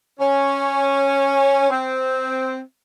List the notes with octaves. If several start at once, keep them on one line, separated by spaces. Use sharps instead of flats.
C#4
C4